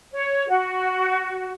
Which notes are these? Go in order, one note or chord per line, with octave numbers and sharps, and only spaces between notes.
C#5
F#4